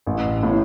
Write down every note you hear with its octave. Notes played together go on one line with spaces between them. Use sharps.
A1
A2